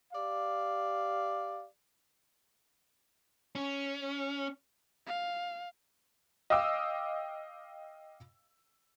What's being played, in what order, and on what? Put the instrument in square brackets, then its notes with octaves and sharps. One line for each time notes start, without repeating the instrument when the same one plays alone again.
[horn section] G4 D5 F5
[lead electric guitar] C#4
[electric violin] F5
[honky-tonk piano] D#5 F5 G5 D6 E6